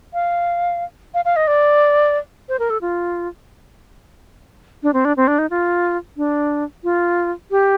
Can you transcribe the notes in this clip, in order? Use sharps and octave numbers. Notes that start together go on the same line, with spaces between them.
F5
F5
F5
D#5
D5
C5
A#4
A4
F4
D4
C4
D4
C4
D4
D#4
F4
D4
F4
G4